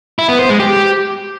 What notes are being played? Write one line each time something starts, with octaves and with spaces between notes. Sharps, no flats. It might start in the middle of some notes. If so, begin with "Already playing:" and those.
E4
B3
C5
G#3
G4